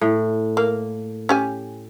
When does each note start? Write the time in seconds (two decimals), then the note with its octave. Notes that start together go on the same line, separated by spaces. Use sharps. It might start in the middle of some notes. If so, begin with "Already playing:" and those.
0.01 A2
0.57 A#3
1.29 C#4 G4 G#5